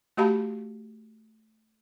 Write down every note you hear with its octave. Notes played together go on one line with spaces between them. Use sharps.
A3 F#4 G4 F5 A5 B5